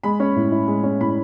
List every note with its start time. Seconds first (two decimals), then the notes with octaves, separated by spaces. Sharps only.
0.04 G#3 B5
0.20 C#4
0.36 A2
0.52 E4
0.67 G#3
0.84 C#4
1.01 A2 B5